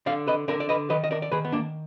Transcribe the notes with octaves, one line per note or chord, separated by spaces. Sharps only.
D3 D5 F5
B4 D#5
D3 A#4 D5
D5
B4 D#5
D#3 B4 D#5
D#5
A#4 D5
D5
D#3 G#4 B4
B3
A#3 D4